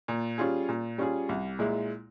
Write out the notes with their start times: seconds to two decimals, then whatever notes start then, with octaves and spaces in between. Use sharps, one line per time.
0.08 A#2
0.38 G3 C#4 F4 G#4
0.69 A#2
0.98 G3 C#4 F4 G#4
1.29 C2
1.59 A#2 G#3 E4